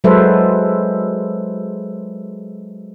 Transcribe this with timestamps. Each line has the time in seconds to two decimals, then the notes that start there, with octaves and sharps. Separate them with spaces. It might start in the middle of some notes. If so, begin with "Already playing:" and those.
0.04 F#3 G#3 A4 B4 C5 E5